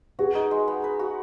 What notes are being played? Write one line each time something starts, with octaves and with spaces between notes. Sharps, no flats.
F#4 G#4 B4
D#4
G#3
B3
B4
F#4